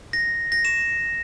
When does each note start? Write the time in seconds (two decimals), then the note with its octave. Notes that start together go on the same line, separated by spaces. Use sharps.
0.13 A#6
0.52 A#6
0.65 E7